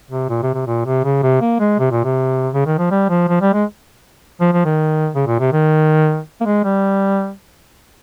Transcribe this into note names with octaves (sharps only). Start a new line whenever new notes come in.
C3
A#2
C3
C3
A#2
C3
C#3
C3
A#3
G#3
C3
A#2
C3
C#3
D#3
F3
G3
F3
F3
G3
G#3
F3
F3
D#3
C#3
A#2
C3
D#3
A#3
G#3
G3